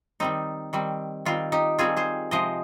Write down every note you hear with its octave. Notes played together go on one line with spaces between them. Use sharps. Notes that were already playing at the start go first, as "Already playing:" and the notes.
D#3 G3 C4 D#4
D#3 G3 C4
D#3 G3 C4 F4
D#4 G4
D#3 G3 C4 F4 G#4
G#4 C5
C3 F3 G#3 C5 D#5